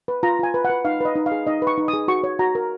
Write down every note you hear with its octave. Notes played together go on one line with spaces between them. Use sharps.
B4
F4 A#5
F4 G#5
B4
F#5
B4
D#4 F5
B4 D#5
D#4
F5
G#4
D#4 D#5
B4
C#6
D#4
D#6
G#4
F#4 C#6
C#5
F#4 A#5
A#4